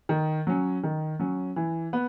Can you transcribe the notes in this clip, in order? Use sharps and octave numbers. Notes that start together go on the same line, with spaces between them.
D#3
F#3 C#4
D#3
F#3 C#4
E3
B3